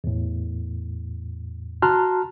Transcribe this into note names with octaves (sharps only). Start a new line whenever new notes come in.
E2 A2
F#4 A5 A#5 C6 F6 F#6